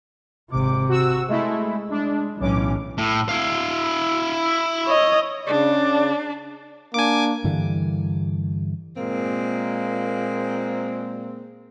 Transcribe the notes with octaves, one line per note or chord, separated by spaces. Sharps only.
G#1 C3 D6
F#4 E6
G#3 A3 E4
G#3 D4
B1 A2 E3 C#4 D6
A2
E4 F5
C#5 D#5
C#3 D4 D5
A#3 D4 G#5 D6
G2 D3 E3 G3
A#2 G#3 A#3 C4